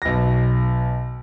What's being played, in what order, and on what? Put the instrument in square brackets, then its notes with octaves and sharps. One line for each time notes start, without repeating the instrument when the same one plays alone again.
[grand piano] B1 A#6